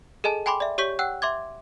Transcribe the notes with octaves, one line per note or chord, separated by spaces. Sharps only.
G#4 A4 D#5 G#5 A5
G5 G#5 B5 C6 D6
D5 E5
G4 C#5 C#6 G6 B6
F#5 G5 E6 F#6
E5 C6 D6 G#6